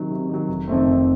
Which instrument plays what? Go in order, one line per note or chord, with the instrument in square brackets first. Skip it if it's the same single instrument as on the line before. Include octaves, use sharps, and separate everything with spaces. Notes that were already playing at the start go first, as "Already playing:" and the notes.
Already playing: [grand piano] C3 D#3 F#3
C3
D#3 F#3
F1
F2 D#3 A3 C4
F1